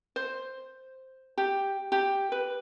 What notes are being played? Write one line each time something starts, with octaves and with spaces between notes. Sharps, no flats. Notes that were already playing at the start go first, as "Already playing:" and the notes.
C5
G4
G4
B4